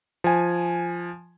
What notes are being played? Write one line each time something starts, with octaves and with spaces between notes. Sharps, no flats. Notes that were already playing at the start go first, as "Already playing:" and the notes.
F3 G#5